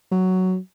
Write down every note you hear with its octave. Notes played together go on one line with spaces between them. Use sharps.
F#3